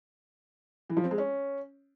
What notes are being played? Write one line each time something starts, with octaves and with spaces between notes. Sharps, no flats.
E3
F3
C4
G#3
C#4